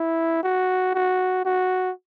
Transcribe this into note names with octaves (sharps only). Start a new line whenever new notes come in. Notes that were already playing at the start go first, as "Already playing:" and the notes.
Already playing: E4
F#4
F#4
F#4